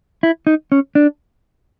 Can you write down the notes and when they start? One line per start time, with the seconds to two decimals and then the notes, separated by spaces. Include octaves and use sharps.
0.23 E4
0.47 D#4
0.72 C#4
0.95 D4